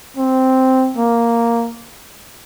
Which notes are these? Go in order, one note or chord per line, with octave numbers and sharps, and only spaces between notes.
C4
A#3